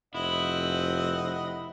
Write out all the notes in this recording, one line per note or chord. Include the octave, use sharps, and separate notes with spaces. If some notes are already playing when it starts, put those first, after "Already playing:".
F1 C4 E4 D#5 F#5